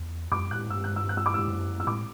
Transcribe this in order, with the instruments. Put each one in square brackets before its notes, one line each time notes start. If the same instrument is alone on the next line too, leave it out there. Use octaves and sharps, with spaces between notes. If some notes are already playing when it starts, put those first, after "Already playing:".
Already playing: [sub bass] E2
[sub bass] F#2 [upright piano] D6
[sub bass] A2 [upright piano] F#6
[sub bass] G2 [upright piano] E6
[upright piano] F#6
E6
F#6
E6
D6
E6
[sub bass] G2
F#2
[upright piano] E6
[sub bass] A2 [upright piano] D6